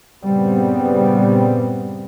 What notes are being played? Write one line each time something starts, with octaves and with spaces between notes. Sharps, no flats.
G2 A#2 C#3 G3 B3 C4